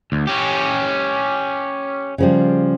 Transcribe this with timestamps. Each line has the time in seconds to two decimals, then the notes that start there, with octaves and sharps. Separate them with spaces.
0.12 D2
0.27 C#4 G4
2.18 C#3 F3 G3